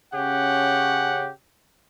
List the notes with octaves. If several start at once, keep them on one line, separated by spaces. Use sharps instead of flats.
C#3 C#4 G4 F#5